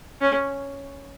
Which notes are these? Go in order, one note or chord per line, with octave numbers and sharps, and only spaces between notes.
C#4